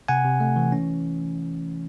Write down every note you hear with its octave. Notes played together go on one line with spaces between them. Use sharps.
C3 F#5 G#5
C3
A3
E3
C#4